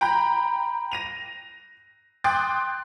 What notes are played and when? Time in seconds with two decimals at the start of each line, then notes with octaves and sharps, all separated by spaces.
0.01 G5 A#5 B5 G6
0.92 A#6 D#7 F7
2.24 G5 C6 D6 D#6 F#6 A6